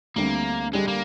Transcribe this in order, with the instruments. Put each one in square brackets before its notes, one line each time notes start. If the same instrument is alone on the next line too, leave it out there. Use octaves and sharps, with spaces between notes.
[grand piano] D2 D3 G3 C4 [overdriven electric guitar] A#3
[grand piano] D3 G3 D4 G4 [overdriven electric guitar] G#3
[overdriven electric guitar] A#3